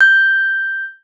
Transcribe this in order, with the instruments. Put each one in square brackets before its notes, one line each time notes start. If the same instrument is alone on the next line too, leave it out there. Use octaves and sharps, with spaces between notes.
[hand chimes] G6